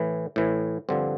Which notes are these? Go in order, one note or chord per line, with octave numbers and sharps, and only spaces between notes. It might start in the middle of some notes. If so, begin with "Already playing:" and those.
Already playing: A2 E3
A2 E3
G2 D3 F3 C4